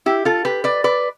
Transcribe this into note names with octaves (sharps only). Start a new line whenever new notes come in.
E4 G4
F4 A4
G4 B4
B4 D5
B4 D5